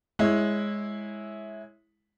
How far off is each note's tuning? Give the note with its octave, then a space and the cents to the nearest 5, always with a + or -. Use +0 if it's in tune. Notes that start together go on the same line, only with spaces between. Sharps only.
G#3 +0 E4 -10 C#5 -15